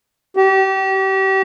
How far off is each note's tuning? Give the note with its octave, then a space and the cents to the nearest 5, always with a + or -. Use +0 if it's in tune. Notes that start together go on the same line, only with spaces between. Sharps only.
G4 -30